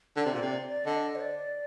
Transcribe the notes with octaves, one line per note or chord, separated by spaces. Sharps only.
D3 D5
C3
A#2
C3
D5
D5
D3 D#5
C5
D5